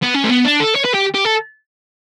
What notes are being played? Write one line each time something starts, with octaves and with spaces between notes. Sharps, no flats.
B3
C#4
A3
B3
D4
A4
C#5
B4
G4
G4
A4